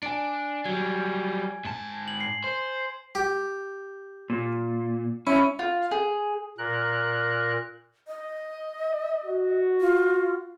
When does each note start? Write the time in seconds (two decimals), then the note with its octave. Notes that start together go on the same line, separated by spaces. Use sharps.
0.03 D4 G#5 D7
0.65 F#3 G3 G#6
1.65 G#2 A5
2.08 F#7
2.20 C7
2.44 C5
3.15 G4
4.30 A#2
5.27 C#4 E4
5.59 F4
5.91 G#4
6.58 A#2 A#4 F#6
8.08 D#5
9.25 F#4
9.81 F4